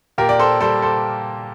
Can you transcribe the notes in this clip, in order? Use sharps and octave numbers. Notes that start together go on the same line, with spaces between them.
A#2 G4 A#4
D5
A4 C5
G3 A4 C5
A4 C5